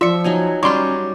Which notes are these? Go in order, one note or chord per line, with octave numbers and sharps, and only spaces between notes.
F3 F4 D5 E5 C#7
F#3 D#4 G#5
F#3 G3 C#4 F4 C6 C#6